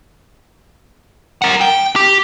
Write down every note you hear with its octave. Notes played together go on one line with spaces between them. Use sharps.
A#4 F#5
G5
G4